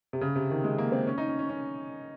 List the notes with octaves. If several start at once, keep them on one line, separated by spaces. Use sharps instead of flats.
C3
C#3
C3
D#3
G#3
A#3
C4
C#4
D#4
C#4
C#4
C#4